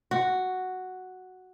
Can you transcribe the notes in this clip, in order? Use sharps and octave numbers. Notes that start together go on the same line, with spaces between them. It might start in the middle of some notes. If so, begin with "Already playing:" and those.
F#4